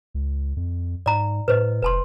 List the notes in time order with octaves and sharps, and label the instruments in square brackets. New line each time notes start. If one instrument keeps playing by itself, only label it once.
[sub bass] C#2
F2
[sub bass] G#2 [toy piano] D5 A#5
[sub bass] A2 [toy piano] B4 C5 D#5
[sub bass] F1 [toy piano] B4 A5 C6